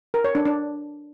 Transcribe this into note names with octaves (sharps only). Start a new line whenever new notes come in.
A#4
C#5
D4
D4